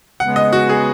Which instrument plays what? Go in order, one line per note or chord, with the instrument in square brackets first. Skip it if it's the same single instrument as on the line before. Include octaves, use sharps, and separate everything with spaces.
[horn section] C#3 G#3 B3 [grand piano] F#5
[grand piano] D#5
F#4
G#4